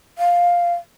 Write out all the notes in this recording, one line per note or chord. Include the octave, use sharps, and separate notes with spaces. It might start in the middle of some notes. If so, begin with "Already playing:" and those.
F5